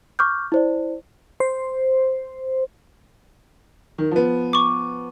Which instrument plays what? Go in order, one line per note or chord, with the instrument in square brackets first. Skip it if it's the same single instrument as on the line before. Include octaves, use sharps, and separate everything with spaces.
[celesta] C#6 D6 F6 G6
E4 C5 D5
[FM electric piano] C5
[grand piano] D#3
F3 B3
[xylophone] C#6 D6